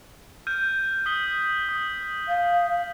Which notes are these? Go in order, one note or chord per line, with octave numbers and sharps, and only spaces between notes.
F6 G6 D#7
D#6 B6 G7
D#6
F5